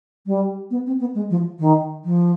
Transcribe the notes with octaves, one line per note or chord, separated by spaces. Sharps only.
G3
B3
C4
B3
G#3
F3
D#3
F3